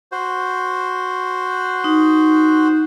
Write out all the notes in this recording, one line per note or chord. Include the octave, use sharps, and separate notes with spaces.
F#4 C5
D#4